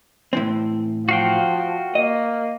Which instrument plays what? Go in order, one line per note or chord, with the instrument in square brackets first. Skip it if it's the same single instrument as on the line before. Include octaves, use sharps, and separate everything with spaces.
[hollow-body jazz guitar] A2 E3 C4
[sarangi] F3 [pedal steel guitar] F#4 F5 G5
[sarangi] A#3 [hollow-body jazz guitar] D#5